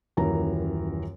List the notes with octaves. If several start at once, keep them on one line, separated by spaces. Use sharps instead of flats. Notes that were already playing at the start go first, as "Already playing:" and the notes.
D#1 F#2 E3 A#4 A#5